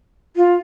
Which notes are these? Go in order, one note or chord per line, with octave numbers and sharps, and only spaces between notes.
F4